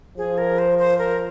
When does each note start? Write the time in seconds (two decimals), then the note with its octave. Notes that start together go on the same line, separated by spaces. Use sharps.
0.18 F3 G#4
0.38 A#4
0.59 C5
0.79 C5
0.98 A#4